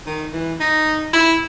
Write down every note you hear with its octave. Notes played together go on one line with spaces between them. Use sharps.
D#3
E3
D#4
E4